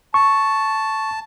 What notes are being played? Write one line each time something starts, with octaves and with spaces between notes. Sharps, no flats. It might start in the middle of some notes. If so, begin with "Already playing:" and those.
A5 C#6